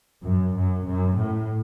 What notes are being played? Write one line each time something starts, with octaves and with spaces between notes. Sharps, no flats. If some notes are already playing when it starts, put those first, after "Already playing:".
F#2
F#2
F#2
A2